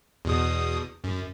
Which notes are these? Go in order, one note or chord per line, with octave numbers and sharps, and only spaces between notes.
E2 B2 D#6
F#2